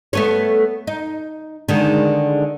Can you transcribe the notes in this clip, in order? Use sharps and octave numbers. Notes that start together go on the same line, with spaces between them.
A3 B3 C#5
D#4
D3 D#3 G#3